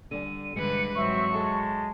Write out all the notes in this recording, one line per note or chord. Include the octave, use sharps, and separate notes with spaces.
D3 G3 G#5 D#7
G2 D3 E3 G3 G#3 B4 C#7
G#2 F#3 C4 E5 C#6
G#3 A4 E5 A5